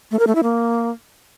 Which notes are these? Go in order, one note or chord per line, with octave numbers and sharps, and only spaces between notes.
A3
A#4
A3
E4
A#3